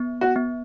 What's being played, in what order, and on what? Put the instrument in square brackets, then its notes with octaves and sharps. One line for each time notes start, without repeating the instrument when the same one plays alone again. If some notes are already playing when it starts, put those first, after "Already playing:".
Already playing: [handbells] B3
[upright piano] F#4
[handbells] B3